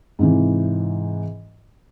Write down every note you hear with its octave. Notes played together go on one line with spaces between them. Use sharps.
G#2 C3 E3